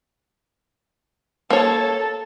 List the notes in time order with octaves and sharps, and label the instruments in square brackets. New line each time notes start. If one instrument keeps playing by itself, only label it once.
[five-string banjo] A#3 C#5 [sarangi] A4 [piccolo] A5